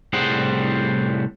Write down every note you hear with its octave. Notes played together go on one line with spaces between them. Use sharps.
C2 A2 G3 G#4 C5 F#5